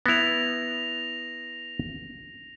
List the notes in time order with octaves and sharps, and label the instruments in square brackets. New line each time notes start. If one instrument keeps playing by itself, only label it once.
[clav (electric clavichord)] B3 E4 [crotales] A#6 F7